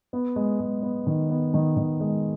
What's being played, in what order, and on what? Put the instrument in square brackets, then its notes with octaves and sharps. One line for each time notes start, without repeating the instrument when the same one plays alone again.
[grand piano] B3
G#3
G#3
B3
D#3
B3
D#3
D#3
G#3